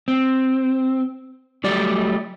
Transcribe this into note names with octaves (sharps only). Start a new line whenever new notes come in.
C4
F#3 G3 A3 G4 D5 D#5